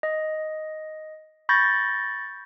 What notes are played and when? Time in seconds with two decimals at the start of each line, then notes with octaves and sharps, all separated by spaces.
0.03 D#5
1.49 B5 C#6 G6 A6 A#6